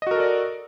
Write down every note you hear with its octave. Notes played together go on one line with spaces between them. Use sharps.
F#4 A4 A#4 D5 D#5